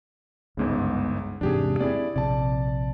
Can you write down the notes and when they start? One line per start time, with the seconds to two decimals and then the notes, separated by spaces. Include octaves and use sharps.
0.57 G1 C#2 G#2 C#3 B3
1.41 E2 G#2 C3 D4 G4 G#4
1.81 B3 C4 E4 G#4 D5
2.16 A#1 C3 D5 A5